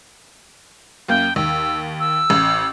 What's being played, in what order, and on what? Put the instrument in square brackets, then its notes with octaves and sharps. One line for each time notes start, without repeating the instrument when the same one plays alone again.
[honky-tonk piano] F#2 A#3 [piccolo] G5
[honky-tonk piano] D#2 [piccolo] E6
[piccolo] E6
[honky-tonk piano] A1